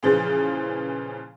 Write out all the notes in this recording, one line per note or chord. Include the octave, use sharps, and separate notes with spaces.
A#2 C#3 E3 F3 G#3